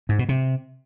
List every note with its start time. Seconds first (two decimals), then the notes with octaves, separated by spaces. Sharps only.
0.09 G#2
0.19 B2
0.29 C3